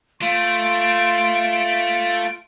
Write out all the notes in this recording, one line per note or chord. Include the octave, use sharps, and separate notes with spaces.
A3 F4 C6 D7